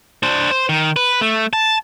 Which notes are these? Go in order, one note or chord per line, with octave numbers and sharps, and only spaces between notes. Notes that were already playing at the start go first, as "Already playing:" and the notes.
D4 C5
C5
D#3
B4
A3
A5